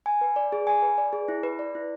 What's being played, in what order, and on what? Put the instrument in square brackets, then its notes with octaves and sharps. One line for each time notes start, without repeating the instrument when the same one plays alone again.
[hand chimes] G#5
B4
D5
G#4
G#5
B4
D5
G#4
E4
B4
D5
E4